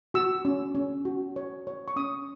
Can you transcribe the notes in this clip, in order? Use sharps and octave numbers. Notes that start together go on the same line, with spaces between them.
F#4 E6
C#4
C#4
F#4
C#5
C#5
C#6
C#4 D#6